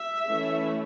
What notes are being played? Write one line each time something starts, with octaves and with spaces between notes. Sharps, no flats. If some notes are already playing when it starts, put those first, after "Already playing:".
Already playing: E5
E3 A3 C#4